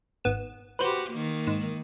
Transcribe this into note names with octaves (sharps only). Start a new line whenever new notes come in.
G#1 B3 E7
F#4 G4 B4 C5
D#3 A#3
G#2 E7